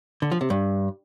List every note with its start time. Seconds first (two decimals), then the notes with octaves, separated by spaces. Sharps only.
0.22 D3
0.31 F3
0.41 C3
0.50 G2